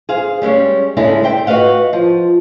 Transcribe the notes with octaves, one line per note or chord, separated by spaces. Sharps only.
G#4 C5 F5
G3 G#3 C4 C#4
C#3 G#3 C#4 D4 E4 A4
C5 E5 G5
F#4 B4 D#5 F5 F#5
F3